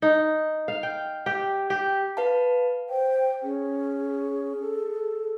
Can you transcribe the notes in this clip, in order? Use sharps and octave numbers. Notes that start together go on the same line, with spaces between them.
D#4
F5
G5
G4
G4
B4 F5 A5
C5 G5
C#4 G#4
A4